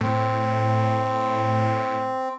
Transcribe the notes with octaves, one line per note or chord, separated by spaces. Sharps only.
A2 C4